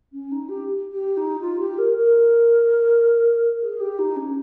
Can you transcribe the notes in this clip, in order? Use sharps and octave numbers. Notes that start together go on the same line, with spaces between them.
C#4
D#4
G4
G4
D#4
F4
G4
A#4
A#4
G#4
G4
D#4
C#4